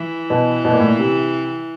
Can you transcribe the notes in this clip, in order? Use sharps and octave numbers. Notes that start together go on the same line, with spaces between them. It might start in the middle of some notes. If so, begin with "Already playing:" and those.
Already playing: E3
B2
B2
A#2
A2
A#2
C3